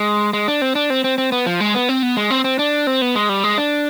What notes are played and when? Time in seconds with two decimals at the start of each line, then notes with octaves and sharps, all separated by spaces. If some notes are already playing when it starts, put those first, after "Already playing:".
Already playing: G#3
0.33 G#3
0.48 D4
0.62 C4
0.75 D4
0.90 C4
1.04 C4
1.18 C4
1.32 B3
1.46 F3
1.60 G#3
1.75 B3
1.89 C4
2.03 B3
2.17 G#3
2.30 C4
2.44 C4
2.59 D4
2.87 C4
3.02 B3
3.15 G#3
3.29 G3
3.44 G#3
3.58 D4